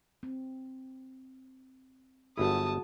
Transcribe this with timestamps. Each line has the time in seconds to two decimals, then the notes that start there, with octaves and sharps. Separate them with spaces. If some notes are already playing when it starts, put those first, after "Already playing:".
0.23 C4
2.38 G1 E4 F#4 G#4 A5 D#6